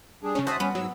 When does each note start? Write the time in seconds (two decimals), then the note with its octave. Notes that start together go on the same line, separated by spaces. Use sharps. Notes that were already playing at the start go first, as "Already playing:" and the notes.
0.23 G3 D4 G#4
0.35 C#3 C#4
0.47 F#4 C5 E5 A5 D#6
0.60 G3 B3 C#4
0.75 G#2 F#3 E6